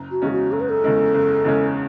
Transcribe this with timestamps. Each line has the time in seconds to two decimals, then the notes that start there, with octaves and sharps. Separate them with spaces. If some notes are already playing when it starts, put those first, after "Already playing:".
Already playing: F#1
0.11 F#4
0.22 E2 C#3 G#3 C#4 G#4
0.31 F#4
0.52 F#1 A4
0.61 B4
0.70 A4
0.83 E2 C#3 G#3 C#4
1.14 F#1
1.45 E2 C#3 G#3 C#4